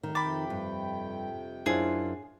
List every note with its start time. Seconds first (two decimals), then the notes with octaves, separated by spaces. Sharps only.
0.03 D#3 F#3 G3 A3
0.15 F2 C3 G5 B5 D6 A6
0.50 G2
1.66 F#2 D4 E4 F4 G#4 C5